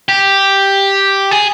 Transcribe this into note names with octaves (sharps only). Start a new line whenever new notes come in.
G4
G#4